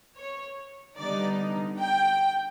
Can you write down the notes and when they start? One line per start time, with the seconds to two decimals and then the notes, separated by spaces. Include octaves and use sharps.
0.16 C#5
0.97 D3 G3 B3 D#4 D5
1.78 G5